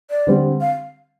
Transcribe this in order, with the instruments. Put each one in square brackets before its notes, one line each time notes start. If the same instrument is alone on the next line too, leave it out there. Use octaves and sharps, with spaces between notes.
[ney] D5
[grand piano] D3 G3 C4
[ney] F5